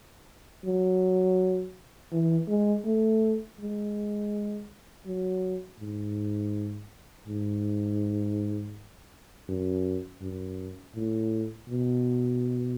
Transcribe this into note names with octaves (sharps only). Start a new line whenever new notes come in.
F#3
E3
G#3
A3
G#3
F#3
G#2
G#2
F#2
F#2
A2
B2